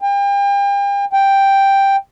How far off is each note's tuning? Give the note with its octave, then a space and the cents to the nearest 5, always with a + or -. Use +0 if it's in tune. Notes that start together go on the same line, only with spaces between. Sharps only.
G5 +40
G5 +5